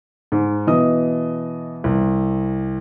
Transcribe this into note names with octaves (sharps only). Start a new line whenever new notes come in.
G#2
B2 E3 D#5 D#6
C2